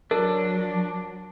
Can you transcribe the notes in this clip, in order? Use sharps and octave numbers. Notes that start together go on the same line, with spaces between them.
F#3 D4 A#4